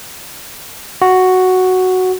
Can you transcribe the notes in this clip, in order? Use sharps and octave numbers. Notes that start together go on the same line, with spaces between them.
F#4